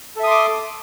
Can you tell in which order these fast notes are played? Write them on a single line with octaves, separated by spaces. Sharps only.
A4 E5 D#6 C6 D6